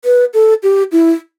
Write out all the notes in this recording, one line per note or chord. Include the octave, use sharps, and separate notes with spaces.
B4
A4
G4
E4